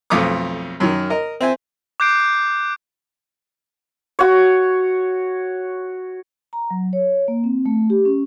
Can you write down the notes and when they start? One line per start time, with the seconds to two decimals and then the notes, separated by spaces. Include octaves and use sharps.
0.10 B1 F2 A3 D6 D#6
0.80 F#2 D#3
1.10 A#4 D#5
1.41 C4 E5 G#5
2.00 D6 F#6 G6 C7 D7
4.19 F#4 C#5
6.53 A#5
6.70 F#3
6.93 C#5
7.28 A#3
7.44 C4
7.66 A3
7.90 G4
8.05 C#4